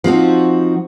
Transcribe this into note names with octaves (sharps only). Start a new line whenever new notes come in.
F3 C4 D#4 F#4